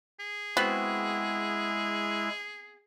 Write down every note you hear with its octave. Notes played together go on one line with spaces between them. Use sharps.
G#4
G#3 B3 C4 E4 F#4